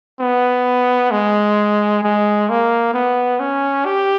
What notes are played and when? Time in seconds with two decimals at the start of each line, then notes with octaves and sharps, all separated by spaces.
0.20 B3
1.11 G#3
2.03 G#3
2.49 A#3
2.94 B3
3.40 C#4
3.85 G4